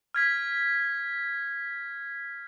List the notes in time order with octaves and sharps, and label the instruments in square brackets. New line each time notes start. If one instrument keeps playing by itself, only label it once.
[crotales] F6 G#6 B6